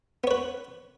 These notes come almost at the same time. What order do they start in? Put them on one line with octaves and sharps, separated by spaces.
B3 C#5 B4